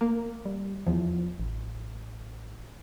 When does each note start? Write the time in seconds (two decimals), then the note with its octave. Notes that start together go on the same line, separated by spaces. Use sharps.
0.01 A#3
0.45 G3
0.87 E2 F3
1.40 A1